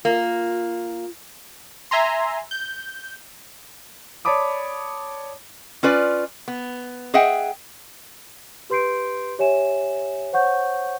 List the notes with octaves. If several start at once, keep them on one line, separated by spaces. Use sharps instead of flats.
A#3 F4
E5 G#5 A#5 C6
G6
C#5 D5 A5 B5 D6 D#6
C#4 F4 B4 D5
B3
G#4 D#5 E5 F#5 G5
G4 B4 C6 G6 C7 D7
G4 C#5 E5 G#5 E7
C5 C#5 F#5 C#6 G6